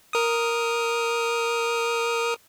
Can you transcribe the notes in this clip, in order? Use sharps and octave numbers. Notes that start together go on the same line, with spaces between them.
A#4 D#6